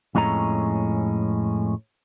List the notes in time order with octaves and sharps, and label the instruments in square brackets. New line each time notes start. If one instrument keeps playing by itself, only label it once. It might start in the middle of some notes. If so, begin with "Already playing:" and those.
[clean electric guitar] F2 A2 G#3 C#4 A#5